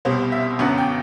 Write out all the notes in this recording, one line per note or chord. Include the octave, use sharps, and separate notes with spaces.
C2 B2 G3 C5
E5
G1 F#2 D3 F#3 B3 F#5
G5